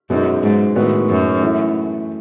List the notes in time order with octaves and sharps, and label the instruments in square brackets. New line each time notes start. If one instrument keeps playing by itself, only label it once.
[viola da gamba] F#2 [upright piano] B2 G#3 D#4
[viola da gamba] G#2
[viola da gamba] A2 [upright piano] D#3 G#3 B3 F#4
[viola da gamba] F#2
[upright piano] E3 A3 E4